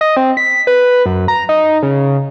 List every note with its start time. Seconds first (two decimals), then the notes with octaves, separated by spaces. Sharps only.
0.01 D#5
0.17 C4
0.37 B6
0.67 B4
1.06 F#2
1.28 A#5
1.49 D#4
1.83 C#3